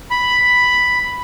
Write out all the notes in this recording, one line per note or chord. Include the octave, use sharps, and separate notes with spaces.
B5